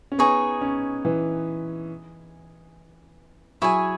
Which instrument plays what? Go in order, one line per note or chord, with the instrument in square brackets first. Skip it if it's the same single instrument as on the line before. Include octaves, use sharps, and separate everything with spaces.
[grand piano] C#4
[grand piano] B3 [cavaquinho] D#4 G#4 C#5
[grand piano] C#4
E3
[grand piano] F#3 [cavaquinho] E4 G#4 C#5 G#5